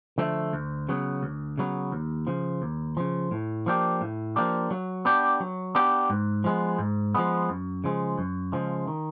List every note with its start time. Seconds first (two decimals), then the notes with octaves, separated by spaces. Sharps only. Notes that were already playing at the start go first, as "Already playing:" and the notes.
0.18 D3 F3 A3
0.53 D2
0.89 C#3 F#3 B3
1.23 D2
1.58 C#3 F#3 B3
1.92 D#2
2.27 C#3 F3
2.62 D#2
2.97 C#3 F3
3.31 A2
3.66 F3 A#3 D4 G4
4.01 A2
4.36 F3 A#3 D4 G4
4.71 F#3
5.05 B3 D4 G4
5.40 F#3
5.75 B3 D4 G4
6.10 G#2
6.44 F3 G#3 B3
6.79 G#2
7.15 F3 G#3 B3
7.49 F#2
7.84 C#3 F3 G#3
8.18 F#2
8.52 C#3 F3 G#3
8.87 D#3